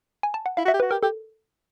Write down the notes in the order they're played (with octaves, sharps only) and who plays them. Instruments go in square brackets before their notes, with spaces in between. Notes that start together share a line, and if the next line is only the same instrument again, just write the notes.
[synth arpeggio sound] G#5
A5
F#5
[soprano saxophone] E4 [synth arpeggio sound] F5
[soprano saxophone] F#4
[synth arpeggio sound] E5
[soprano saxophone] G4
[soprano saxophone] F#4 [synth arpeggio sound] B4
[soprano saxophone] G4 [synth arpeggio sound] A#4
[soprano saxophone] G4 [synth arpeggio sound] A4